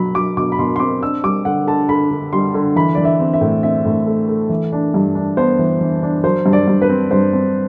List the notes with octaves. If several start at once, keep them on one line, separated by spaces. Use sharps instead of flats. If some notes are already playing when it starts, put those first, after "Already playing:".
Already playing: B2 F#3 B5
F#3 D6
B2 D6
B5
B2 C6
C6
C4 D6
D4 E6
G3 D6
D3 F#5
D3 A5
D3 B5
D3
G3 C6
D3
E3 B5
E3 D5
E5
C4
E5
A2
C4 E5
A2
A3
A3
E3
D4
G2
D4
B3 C5
E3
E3
D4
F#3 C5
G2
D5
G2
B4
C4
G2 C5
C4